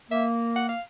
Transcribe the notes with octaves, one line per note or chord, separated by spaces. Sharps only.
A#3 E5
F#5
F5